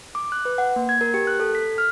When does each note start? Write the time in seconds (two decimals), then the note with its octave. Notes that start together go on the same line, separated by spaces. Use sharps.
0.15 D6
0.32 F#6
0.45 B4
0.58 F#5
0.76 A#3
0.89 G#6
1.01 A#4
1.14 G4
1.27 F#6
1.40 A4
1.55 B6
1.78 F6